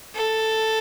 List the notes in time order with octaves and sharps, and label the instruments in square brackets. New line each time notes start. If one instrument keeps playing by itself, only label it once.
[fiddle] A4